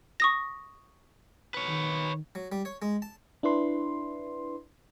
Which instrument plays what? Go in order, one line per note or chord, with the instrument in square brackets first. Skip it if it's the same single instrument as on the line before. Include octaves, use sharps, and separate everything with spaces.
[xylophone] C#6 D#6 A#6
[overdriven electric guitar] B4 C#5
[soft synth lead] D#3
[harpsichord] F#3
G3
C#5
G#3
A5
[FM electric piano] D4 E4 B4 C6